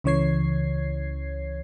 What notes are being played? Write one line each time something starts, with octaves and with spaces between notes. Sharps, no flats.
C#2 C#3 E3 C#5 G#6 C7